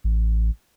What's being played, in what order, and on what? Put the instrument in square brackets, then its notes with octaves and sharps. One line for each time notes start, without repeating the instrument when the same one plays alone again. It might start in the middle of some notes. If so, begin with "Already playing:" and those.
[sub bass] A1